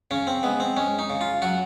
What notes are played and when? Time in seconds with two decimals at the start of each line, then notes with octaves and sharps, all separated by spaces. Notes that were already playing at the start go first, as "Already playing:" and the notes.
0.11 C#3 C#4
0.27 C4
0.43 G#3 B3
0.60 C4
0.77 G#3 C#4
0.99 D#4
1.10 C#3
1.21 F4
1.42 F#3 F#4